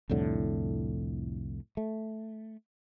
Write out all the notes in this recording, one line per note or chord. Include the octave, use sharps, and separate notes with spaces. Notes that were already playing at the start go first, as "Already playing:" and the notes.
C2 F2 A2 D3
A3